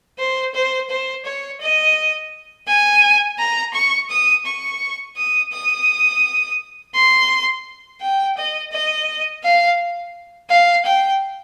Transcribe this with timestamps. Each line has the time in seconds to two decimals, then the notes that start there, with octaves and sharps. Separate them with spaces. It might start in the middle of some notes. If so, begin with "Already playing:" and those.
0.19 C5
0.54 C5
0.90 C5
1.25 C#5
1.61 D#5
2.68 G#5
3.39 A#5
3.74 C#6
4.10 D#6
4.45 C#6
5.17 D#6
5.52 D#6
6.94 C6
8.01 G5
8.37 D#5
8.72 D#5
9.43 F5
10.50 F5
10.85 G5